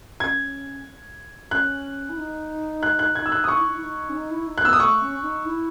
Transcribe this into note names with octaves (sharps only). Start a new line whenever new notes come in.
C#4 G#6
C#4 F#6
E4
D#4
F#6
F#6
G#6
E6
F#6
D#6
D#4 C#6
E4
D#4
E4
D#4
C#4
D#4
E4
D#4
F#6
B3 E6
D#6
A3 C#6
C#4
C#4
D#4
E4